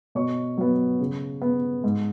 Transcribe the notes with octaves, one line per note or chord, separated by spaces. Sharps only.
B2 C#5 C#6
F#3 B3
C#3
B3
G#2